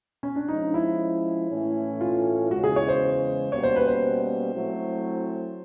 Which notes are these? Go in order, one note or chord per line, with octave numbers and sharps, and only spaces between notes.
C#4
D4
F3 G#3 C#4 D#4
E4
A2 E3 A3 C#4
F4
E2 C#3 E3 G#3 F#4
G#4
C#5
C5
B2 G3 A#3 C#4 C#5
C5
B4
C5
F#3 A3 C4 E4